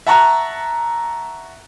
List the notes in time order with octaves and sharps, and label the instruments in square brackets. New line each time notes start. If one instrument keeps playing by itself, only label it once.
[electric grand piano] E5 F#5 A5 A#5 C#6 F#6